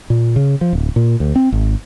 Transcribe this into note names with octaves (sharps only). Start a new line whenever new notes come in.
A#2
C#3
F3
D1
A#2
D2
C4
G#1